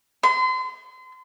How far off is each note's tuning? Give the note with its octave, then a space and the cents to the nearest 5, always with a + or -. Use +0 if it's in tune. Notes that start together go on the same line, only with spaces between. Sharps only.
C6 -35